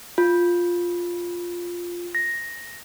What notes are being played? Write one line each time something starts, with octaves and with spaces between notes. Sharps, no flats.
F4
A#6